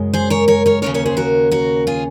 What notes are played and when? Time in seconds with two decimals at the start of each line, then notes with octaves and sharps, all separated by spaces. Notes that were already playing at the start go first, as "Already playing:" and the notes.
Already playing: F#2 C#3 G#3
0.13 G#4 C5
0.30 A#4 C#5
0.48 A#4 C#5
0.66 A#4 C#5
0.82 D#2 C#3 F#3 C#4 A#4 C#5
0.94 A#4 C#5
1.06 G#4 C5
1.17 F#4 A#4
1.51 F#4 A#4
1.87 F4 G#4